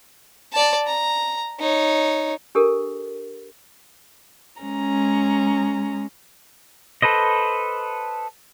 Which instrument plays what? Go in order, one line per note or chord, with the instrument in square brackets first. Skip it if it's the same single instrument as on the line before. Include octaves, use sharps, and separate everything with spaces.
[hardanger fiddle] D5 A5
A#5
D#4 C#5
[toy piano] D4 G4 A4 A#4
[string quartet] G#3 C#4 A#5
[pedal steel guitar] A4 B4 C5 D#5